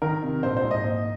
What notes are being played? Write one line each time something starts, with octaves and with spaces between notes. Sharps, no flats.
D#3 A#4
C3
A#1 C5
C5
G#2
D#5
A#3